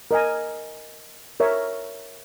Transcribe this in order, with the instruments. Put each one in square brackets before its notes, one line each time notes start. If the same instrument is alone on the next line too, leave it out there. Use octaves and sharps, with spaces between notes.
[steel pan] A#4 D#5 G#5
A#4 C#5 E5